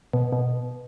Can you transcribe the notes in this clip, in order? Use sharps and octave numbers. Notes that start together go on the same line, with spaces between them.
B2
B2